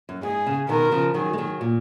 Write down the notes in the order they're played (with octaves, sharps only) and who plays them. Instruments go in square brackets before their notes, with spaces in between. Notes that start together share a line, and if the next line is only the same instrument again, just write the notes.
[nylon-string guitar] F#2
[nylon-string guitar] G#2 [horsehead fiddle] G#4
[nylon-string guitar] C#3
[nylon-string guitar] B2 D#3 [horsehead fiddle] A#4
[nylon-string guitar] C#3 F3
[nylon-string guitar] D#3 F#3 [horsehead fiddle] G#4
[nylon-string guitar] G#3
D#3 F#3
A#2